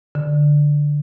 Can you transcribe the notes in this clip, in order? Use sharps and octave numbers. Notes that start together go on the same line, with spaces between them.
D3